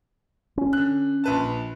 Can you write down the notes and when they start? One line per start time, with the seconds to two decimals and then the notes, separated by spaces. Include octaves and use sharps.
0.57 C#4
0.73 D3 F#6
1.24 A#1 B4 A5